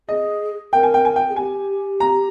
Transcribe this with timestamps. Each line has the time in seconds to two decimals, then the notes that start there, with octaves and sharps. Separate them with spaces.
0.09 G#4 D#5
0.73 A#4 G5
0.83 G#5
0.94 G5
1.05 G#5
1.16 G5
1.29 G#4
1.36 G4 G#5
2.00 A#5